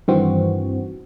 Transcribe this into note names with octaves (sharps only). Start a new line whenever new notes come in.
G2 D#3 E3 C4 F#4